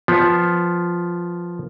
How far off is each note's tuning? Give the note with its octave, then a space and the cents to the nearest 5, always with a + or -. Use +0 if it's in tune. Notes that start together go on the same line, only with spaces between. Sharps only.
F3 +0 B3 +0 F4 +0